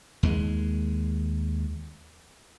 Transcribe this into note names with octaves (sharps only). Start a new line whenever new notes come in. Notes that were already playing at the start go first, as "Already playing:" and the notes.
D#2 G#3